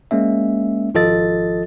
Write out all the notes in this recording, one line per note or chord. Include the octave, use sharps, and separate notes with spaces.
G#3 A#3 C#4 E5
G#1 F3 F4 A4 D#5 A6